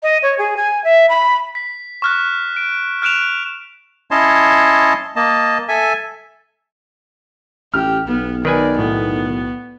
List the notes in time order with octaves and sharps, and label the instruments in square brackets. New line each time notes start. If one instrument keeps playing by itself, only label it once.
[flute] D#5
C#5
G#4
G#5
E5
B5
[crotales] B6
C#6 F6 F#6
D7
F6 F#6 D7 E7 F7
[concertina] C#4 E4 C#5 D#5 A5 C6
A#3 D#5 A5
A4 E5 G#5
[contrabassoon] A1 [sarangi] G4 [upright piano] F6
[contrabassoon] B1 [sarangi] B3
[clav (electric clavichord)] D#3 B4 G#5 [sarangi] D5
[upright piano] A2 [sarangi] B3